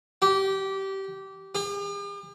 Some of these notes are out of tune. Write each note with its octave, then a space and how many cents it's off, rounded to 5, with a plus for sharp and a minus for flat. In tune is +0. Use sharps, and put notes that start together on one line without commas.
G4 -20
G4 +45